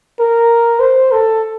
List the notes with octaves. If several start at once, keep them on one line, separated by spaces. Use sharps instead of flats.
A#4
C5
A4